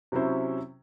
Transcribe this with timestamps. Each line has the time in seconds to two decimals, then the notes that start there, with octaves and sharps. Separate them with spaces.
0.12 C3 F#3 C#4 E4 C5